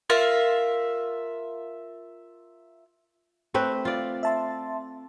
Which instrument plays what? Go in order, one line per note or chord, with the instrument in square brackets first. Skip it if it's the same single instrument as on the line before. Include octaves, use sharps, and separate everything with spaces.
[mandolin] F4 A#4 E5 F5
[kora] A3 C4 B4
F4 D5
[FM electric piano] E5 A5 C6